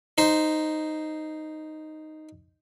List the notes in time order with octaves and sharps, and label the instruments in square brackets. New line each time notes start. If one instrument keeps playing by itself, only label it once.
[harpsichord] D#4 C5